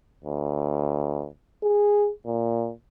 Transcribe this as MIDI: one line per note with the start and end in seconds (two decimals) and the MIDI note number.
0.25 1.27 38
1.63 2.10 68
2.26 2.71 46